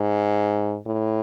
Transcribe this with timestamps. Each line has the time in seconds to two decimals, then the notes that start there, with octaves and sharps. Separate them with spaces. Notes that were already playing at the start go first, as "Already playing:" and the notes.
Already playing: G#2
0.86 A2